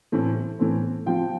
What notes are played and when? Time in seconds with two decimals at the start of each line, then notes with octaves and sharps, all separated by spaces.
0.12 A2 E3 A3 C4
0.59 A2 E3 A3 C4
1.06 F3 C4 F4 G5